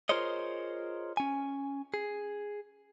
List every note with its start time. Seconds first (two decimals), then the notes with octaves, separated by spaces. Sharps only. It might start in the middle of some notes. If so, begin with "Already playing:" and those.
0.09 F4 G#4 A#4 C5 C#5 D#5
1.17 C#4 G#5
1.94 G#4